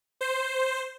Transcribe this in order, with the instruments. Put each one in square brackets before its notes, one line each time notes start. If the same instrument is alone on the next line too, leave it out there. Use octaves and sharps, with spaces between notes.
[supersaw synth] C5